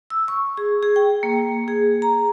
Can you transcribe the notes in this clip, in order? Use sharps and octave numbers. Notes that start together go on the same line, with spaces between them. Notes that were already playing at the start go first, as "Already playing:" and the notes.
E6
C#6
G#4
G#4
G5
A#3
G#4
A#5